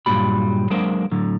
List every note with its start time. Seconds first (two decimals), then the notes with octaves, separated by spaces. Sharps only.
0.06 G2 A#2 F#3 G3 B5
0.70 F#3 G#3 A#3 D4 A#4 C5
1.12 A2 D3 F#3